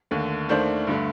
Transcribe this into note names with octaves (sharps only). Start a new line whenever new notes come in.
D#2 D3 A3
D#2 D#3 A3 D4 C5
G2 D3 A3